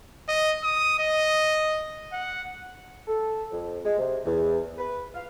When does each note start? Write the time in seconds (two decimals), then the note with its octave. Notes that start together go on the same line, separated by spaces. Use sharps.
0.28 D#5
0.64 D#6
0.99 D#5
2.12 F#5
3.08 A4
3.52 F2
3.84 G#3
3.99 C3
4.26 E2
4.78 B4
5.15 F5